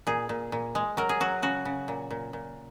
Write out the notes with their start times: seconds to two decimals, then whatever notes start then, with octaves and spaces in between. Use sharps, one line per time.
0.07 A#2 G#4
0.29 A#2
0.52 A#2
0.75 G#3
0.97 F#3 A#4
1.09 G#4
1.20 F#3 F#4
1.42 C#3 F#4
1.65 C#3
1.88 A#2
2.11 A#2
2.33 A#2